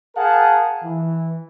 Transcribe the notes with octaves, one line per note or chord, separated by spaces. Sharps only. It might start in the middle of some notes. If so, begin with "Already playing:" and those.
G#4 A#4 F5 F#5 A5
E3